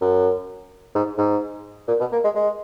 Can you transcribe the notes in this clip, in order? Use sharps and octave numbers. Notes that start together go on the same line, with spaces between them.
F#2
G#2
G#2
A#2
B2
A#3
G#3
G#3